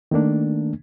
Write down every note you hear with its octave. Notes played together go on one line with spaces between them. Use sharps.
D#3 A3 A#3 D4